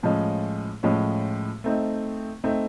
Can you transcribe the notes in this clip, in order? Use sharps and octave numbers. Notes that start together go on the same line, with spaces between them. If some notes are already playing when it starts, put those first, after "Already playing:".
A2 F3 G#3 C#4
A2 F3 G#3 C#4
A3 C4 D#4
A3 C4 D#4